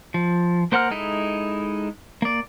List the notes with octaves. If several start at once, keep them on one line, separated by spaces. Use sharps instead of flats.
F3
A#3 C5 F#5 A#5 F6
G#3 D#4 E4 A4
A#3 D5